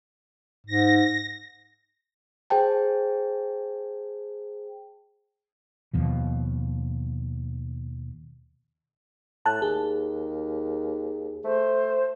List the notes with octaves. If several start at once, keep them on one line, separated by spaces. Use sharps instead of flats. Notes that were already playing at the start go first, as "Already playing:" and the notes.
G#2 A#6
G#4 C5 G5 A5
D#2 B2 F3
A2 A5 F#6
D#2 G#4
A3 C5